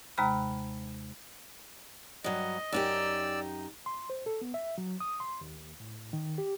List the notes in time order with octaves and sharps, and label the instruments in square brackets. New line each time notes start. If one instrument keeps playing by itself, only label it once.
[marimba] D#2 C3 G#3 A#5 B5 F6
[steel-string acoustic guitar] G2 F#3 [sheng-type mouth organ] D#5
[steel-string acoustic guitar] F#2 D#4 G4 [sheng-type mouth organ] D5 E6
[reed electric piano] C6
C5
A4
B3
E5
F#3
D#6
C6
D#2
A2
D#3
G4